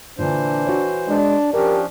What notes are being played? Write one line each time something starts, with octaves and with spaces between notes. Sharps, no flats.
A#2 D3 E3 D4 C5
F#4 C#5
G#3 D4
F3 C#4 D4 G4 A#4 D5